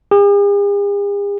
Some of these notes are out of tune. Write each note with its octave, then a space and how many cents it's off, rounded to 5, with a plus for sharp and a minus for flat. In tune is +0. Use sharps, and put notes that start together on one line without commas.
G#4 -45